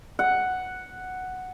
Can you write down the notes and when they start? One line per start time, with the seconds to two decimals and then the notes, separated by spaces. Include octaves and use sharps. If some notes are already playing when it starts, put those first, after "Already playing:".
0.19 F#5